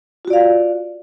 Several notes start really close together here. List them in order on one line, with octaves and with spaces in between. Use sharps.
F4 F#4 D5 F5